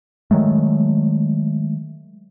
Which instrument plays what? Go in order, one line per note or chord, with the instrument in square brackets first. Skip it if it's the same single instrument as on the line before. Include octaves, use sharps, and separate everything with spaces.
[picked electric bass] D#3 F#3 G#3 A3